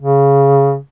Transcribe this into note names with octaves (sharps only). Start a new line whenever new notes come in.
C#3